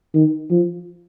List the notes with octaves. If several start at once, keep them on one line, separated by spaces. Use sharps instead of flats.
D#3
F3